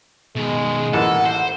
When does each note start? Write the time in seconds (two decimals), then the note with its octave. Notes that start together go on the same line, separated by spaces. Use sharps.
0.36 B2 D#3 G#3
0.93 A1 E3 A#3 A4 F#5
1.25 C5